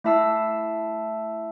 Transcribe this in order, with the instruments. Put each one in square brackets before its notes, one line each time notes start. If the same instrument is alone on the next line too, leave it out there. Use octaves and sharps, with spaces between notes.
[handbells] A3 E4 E5 A5 E6 C7